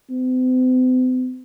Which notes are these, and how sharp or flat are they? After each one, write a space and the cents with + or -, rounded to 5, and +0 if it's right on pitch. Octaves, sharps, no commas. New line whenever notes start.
C4 -45